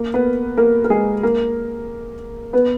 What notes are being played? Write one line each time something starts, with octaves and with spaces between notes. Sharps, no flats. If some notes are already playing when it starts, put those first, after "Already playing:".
Already playing: A#3 A#4
B3 B4
A#3 A#4
A#4
G#3 G#4
A#3 A#4
B3 B4